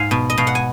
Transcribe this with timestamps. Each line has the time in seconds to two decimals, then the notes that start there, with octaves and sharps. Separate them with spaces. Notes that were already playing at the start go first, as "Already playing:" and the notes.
Already playing: G#2 F5 G#5
0.11 B2
0.30 D#5
0.38 B2 F5
0.47 F#5
0.55 G#5